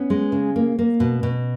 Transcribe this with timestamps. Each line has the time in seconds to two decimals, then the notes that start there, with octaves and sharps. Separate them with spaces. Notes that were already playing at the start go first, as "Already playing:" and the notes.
Already playing: B3 C#4
0.10 G#3
0.32 C#3
0.56 A#3
0.79 A#3
1.00 B2
1.23 B2